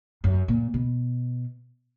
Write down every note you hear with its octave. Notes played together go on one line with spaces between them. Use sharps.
F#2
A#2
B2